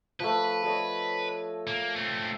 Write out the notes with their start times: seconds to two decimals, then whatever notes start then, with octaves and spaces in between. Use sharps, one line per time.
0.20 F3 A3 B4
0.63 A4 C#5 D#5
1.67 A#3
1.96 A3 C4